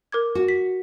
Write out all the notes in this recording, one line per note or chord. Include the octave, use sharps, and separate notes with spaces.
A#4 D6 G#6
F#4
B6